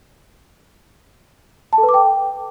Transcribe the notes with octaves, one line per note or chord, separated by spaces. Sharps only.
A5
A4
B4
D6
G5